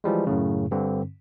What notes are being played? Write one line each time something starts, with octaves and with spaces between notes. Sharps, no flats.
E3 F3 G3 G#3
F#2 A2 C#3
G2 D3 C4